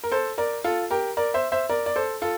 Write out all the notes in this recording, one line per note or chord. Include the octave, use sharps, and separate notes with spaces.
A#4
A4 C5
A#4 D5
F4 A4
G4 A#4
A#4 D5
C5 E5
C5 E5
A#4 D5
D5
A4 C5
F4 A4